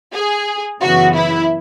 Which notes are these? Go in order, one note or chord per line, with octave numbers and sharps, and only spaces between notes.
G#4
F#2 C#3 E3 B3 F#4
E4